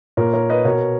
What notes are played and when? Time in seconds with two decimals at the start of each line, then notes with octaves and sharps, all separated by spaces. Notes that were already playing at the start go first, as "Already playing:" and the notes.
0.17 A#2 A#4 C#5
0.33 A#4 C#5
0.50 B4 D#5
0.65 B2 A#4 C#5